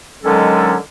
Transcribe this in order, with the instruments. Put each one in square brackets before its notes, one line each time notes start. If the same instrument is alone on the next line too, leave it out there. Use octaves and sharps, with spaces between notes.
[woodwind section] D3 D#3 F#3 G#3 C#4 A4